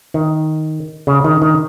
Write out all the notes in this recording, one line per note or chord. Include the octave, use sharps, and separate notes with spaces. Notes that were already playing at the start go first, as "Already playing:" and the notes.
D#3
C#3
D#3
D#3